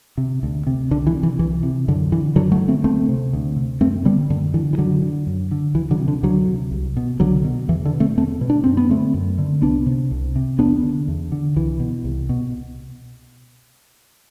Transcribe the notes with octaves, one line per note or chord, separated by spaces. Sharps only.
C3
D2
C3
C2 D3
E3
C3
E3
C2 E3
C3
F#2 D3
D3 E3
F#2 D3 F#3
F#3 A3
D3
A3 C4
D2 A3 C4
C3
D2
C3
F#2 A3 C4
D3 G3 B3
F#2 D3
D3 E3
E3
F#2 D3 F#3
D3
F#2
D3
D2 E3
D3 F#3
C3
D3
D2 D3 F#3
C3
C2
B2
C2 D3 F#3
B2
E2 E3
D3
B2
A3 C4
E2 A3 C4
B2
D4
F#2 C4
B3
D3 A3 C4
F#2
D3
C2 B3 D4
C3
C2
C3
E2 B3 D4
D3
E2
D3
C2 E3
B2
C2
B2